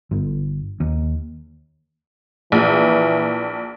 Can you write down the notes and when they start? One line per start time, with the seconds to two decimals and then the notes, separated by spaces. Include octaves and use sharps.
0.11 G1
0.80 D#2
2.52 A#1 E3